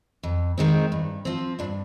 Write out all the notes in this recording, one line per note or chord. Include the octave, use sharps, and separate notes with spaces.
F2
D#3 G#3 C4
G2
F3 C4
G2 D4